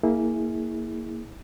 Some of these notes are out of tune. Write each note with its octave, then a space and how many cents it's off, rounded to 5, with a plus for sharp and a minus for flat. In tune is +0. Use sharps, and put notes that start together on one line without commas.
A#3 -5 E4 -25 G#4 +0